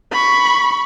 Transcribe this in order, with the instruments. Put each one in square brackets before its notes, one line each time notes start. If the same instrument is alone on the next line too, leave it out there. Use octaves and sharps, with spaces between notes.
[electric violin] B5 C#6